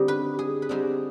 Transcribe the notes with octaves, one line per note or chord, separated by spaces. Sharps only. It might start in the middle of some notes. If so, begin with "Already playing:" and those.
Already playing: D3 G3 C4 D#4
B4
G#4
B4
D3 G3 C4 D#4 G#4